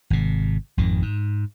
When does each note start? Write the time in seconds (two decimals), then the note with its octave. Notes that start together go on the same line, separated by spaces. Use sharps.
0.10 G#1 C3
0.77 G#1 F2 D#3
1.02 G#2